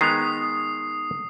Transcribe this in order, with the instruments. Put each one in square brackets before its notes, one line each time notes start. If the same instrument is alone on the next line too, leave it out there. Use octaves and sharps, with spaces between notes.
[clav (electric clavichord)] D#3 G#3 B3 [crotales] D#6 C7